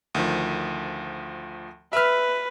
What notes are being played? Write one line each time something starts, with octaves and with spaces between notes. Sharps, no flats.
D2 D#3 F3
B4 E5 F6